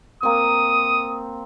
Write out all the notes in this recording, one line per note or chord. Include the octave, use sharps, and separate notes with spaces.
A#3 C4 D#6